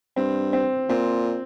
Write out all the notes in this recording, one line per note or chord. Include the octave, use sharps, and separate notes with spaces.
G2 C4
C4
A#2 C4